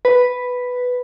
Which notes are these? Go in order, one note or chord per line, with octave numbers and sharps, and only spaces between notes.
B4